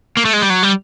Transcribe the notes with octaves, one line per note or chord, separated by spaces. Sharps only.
A#3
A3
G#3
G3
F#3
G3